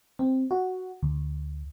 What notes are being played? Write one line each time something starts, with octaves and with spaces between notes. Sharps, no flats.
C4
F#4
D2